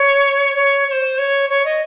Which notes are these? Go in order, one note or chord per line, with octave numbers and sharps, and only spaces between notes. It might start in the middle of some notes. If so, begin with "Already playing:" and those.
Already playing: C#5
C#5
C#5
C5
C#5
C#5
D#5